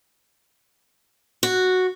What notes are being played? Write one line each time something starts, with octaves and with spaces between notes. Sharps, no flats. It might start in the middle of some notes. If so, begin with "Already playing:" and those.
F#4